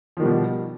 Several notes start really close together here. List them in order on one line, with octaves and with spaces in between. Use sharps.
F3 D#3 G3 B2